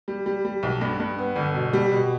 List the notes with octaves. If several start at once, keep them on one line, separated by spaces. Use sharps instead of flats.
G3
G3
G3
B1
G2
G2
B3
G1
B2
G3
B2